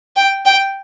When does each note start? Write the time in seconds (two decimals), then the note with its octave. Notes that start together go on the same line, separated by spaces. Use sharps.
0.16 G5
0.45 G5